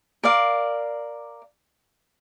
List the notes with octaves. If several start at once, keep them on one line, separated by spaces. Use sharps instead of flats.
A#4 D5 F5